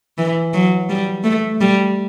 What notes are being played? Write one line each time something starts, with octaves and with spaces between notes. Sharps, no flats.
E3
F#3
G3
A3
G3